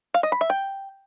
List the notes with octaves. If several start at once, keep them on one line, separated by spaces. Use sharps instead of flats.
F5
D#5
B5
E5
G5